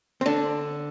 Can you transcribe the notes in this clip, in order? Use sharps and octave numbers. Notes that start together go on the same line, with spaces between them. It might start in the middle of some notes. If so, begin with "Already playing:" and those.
C4
D3 D4